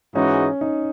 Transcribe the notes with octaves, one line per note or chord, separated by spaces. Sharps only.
G#2 E3 G#3 C#4 D#4 F#4
D#4